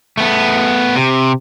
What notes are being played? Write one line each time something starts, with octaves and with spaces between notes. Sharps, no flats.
A3 B3
C3